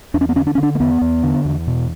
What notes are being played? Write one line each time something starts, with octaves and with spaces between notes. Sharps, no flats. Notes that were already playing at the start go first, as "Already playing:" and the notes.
E2 D4
C#4
B3
D3 C#4
D4
C#4
D3
D4
A#3
E2 B3
E2
D3
E2
B2